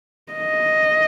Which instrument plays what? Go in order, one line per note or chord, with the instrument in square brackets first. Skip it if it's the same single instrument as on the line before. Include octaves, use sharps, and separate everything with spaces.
[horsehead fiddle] D#5